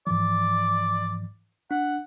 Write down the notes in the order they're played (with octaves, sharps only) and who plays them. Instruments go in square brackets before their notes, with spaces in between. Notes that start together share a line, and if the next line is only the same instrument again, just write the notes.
[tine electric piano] G#2 E3 F3 [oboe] D5
[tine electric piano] D4 [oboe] F#5